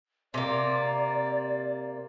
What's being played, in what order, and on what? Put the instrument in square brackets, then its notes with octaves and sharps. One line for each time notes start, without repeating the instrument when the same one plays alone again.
[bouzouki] C3 A#3 [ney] D5